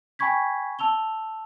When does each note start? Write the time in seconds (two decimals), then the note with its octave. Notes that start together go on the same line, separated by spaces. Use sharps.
0.19 G5 G#5 B5 C#6 G#6 B6
0.79 A5 E6 F7 G7